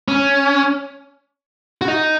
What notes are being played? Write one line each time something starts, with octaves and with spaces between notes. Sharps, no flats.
C#4
F#4
D#4